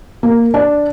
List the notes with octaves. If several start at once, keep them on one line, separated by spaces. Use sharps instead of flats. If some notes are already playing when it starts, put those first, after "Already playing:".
A#3
D4